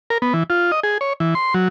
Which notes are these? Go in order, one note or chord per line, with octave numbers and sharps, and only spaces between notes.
A#4
B3
E3
F4
D#5
G#4
C#5
E3
C6
F#3